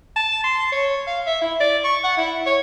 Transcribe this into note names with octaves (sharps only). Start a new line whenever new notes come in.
A5
C6
C#5
F5
E5
E4
D5
C#6
F#5
E4
C#5